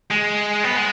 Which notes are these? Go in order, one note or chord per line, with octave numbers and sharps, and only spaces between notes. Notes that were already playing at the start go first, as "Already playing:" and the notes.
G#3
B3
G#3